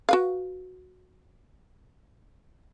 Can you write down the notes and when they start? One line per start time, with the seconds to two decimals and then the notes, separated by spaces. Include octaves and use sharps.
0.09 F#4 B4 F5